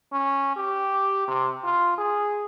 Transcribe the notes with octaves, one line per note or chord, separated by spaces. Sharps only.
C#4
G4
C3
F4
G#4